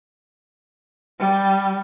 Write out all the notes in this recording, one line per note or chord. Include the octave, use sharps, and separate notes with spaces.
G3